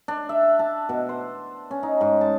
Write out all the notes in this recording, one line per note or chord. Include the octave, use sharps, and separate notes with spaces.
D4
E5
A5
B2
C5
C#4
D#4
G#2
A5